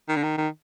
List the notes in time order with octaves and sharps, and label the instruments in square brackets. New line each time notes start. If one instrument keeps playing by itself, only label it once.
[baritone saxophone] D#3
D3
D#3
D#3